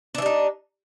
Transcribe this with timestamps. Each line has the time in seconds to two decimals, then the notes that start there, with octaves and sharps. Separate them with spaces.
0.15 D4
0.18 E3
0.22 G3
0.26 D#4